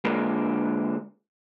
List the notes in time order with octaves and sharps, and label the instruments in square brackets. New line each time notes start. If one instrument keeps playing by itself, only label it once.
[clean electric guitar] D3 G#3 A#3 D4 F4 A#4